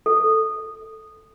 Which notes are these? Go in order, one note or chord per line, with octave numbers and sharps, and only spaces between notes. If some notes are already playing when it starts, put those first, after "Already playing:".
A4